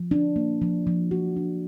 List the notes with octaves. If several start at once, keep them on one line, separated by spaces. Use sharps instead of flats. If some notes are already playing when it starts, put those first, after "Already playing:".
Already playing: F3
D4
A#3
F3
F3
F#4
D4